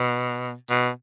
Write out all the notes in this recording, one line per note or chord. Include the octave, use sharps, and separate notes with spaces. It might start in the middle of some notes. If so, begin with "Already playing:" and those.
Already playing: B2
B2